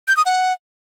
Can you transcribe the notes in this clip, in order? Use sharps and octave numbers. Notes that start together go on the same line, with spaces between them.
G6
D#6
F#5